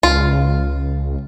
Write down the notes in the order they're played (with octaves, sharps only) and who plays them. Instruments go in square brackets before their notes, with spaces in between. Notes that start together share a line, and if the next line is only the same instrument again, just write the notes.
[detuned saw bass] C#2 [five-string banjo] F4